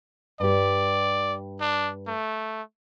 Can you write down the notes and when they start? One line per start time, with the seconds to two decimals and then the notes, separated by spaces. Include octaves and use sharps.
0.40 G2 G4 D5
1.60 D4
2.07 A3